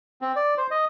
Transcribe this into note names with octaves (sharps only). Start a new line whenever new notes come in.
C4
D5
C5
D#5